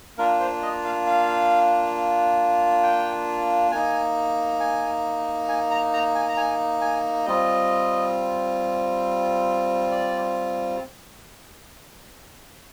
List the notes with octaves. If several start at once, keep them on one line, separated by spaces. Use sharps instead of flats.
A#3 D4 F4 A#4
C5
D#5
F5
F5
G5
A#3 D#4 G#5
G#5
G#5
A#5
A#5
G#5
A#5
G#5
G#5
G3 C4 F4 D#5
D5